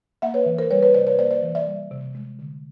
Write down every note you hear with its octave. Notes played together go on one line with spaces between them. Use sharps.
A#3 E5 F#5
B4 C#5
E3
A#4 C5
G3 B4 C#5
B4 C#5
C3 C5 D5
B4 C#5
A#3 C5 D5
C5 D5
E3
D5 E5
G3
C3
G#3
D3